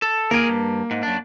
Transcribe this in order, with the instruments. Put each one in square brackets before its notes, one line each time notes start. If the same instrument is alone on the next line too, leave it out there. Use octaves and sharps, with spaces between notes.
[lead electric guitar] A4
[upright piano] A#3 D7 [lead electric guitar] G#4 A#4
[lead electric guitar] G2
G#2
F#2 D4